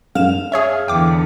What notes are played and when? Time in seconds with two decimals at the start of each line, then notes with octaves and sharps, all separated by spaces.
0.15 F#2 F5 E7
0.52 G#4 C#5 E5
0.88 E2 D3 G5 D6